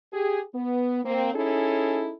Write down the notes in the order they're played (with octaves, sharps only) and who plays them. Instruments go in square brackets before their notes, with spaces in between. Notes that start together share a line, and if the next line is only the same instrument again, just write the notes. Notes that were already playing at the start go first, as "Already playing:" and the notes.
[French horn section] G4 G#4
B3
A#3 C4
C#4 D#4 E4 G#4 A4